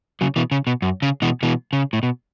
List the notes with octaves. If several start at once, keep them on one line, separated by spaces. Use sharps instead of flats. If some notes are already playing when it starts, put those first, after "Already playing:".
C#3 F#3
B2 E3
C#3
B2
F#2
C#3
B2 E3
B2 E3
C#3
A2
B2